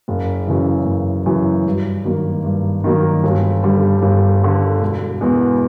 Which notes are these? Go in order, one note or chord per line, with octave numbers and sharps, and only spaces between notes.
F#1
F#2 C#3 E3
F#1
F#2 C#3 E3
G2
D#3 F#3 A#3
G2
D#3 F#3 A#3
G1
G2 D3 G3
G1
G2 D3 G3
E1
E2 B2 G#3 B3